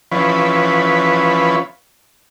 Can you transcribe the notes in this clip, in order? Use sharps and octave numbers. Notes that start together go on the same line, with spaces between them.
E3 F3 C#4 B4